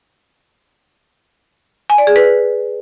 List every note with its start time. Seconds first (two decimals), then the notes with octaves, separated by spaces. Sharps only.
1.90 G#5
1.98 D5
2.07 G#4
2.16 B4